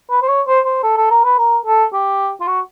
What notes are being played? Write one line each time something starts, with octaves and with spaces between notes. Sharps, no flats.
B4
C5
C#5
C5
C5
A4
A4
A#4
B4
A#4
A4
G4
F4
F#4